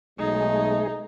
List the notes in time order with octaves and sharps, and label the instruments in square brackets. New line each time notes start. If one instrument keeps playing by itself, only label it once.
[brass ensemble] B1 A3 [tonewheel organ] G#3 G#4 [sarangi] D#4